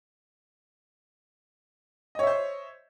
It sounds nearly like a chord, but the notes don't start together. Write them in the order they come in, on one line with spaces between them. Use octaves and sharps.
D#5 C#5 E5 C5